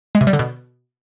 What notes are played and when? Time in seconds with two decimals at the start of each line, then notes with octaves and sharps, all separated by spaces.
0.15 G#3
0.21 C3
0.27 G3
0.33 D3
0.39 B2